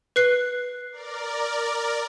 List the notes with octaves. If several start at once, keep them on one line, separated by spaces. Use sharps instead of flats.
B4 F#6 C7
A#4 D5